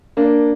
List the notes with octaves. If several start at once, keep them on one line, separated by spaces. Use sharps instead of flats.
A#3 D4